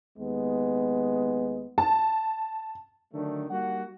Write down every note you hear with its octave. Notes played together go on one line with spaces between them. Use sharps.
D#2 G#3 B3
A5
D3 D#3 F#3 A3 D4
G3 A#3 D#4 F#4 F#5